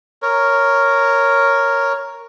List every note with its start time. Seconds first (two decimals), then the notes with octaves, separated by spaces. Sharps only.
0.22 A#4 C#5